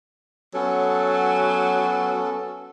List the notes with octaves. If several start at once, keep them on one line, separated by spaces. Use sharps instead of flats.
F#3 B3 C#4 A4